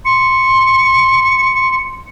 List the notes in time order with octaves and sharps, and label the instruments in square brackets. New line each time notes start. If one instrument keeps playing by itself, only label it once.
[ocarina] C6 [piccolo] C#7